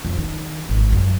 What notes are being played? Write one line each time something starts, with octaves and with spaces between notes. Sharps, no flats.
F2
D#3
G#1
F#2